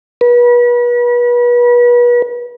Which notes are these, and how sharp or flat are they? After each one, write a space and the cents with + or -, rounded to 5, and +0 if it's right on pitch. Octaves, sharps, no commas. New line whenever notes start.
B4 -35